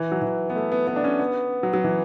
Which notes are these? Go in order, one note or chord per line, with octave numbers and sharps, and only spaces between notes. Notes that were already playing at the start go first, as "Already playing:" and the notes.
Already playing: E3
F#3
E3
B3
A3
B3
B3
D4
C#4
B3
F#3
F#3
E3